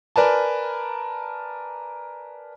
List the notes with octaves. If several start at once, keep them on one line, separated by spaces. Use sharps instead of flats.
A#4 B4 D5 G#5 A5